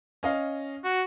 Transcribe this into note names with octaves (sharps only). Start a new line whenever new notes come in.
C#4 D#5 F5
F#4